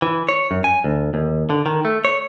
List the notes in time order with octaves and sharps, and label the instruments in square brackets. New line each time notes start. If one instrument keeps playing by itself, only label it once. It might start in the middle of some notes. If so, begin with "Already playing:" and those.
[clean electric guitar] E3
C#5
F#2
G#5
D2
D#2
D3
D#3
A3
C#5